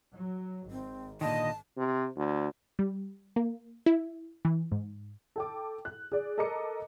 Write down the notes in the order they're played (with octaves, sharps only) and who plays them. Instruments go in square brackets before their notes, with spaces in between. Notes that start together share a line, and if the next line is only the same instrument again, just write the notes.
[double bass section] F#3
[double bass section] G#1 [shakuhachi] C4
[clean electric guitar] A#2 D3 D#3 [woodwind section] D#5 [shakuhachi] A5
[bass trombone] C3
D2
[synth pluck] G3
A#3
E4
E3
G#2
[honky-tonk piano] A4 G5 D6
F#6
G#4 D5
A4 A#4 D#5 A#5 D6 C#7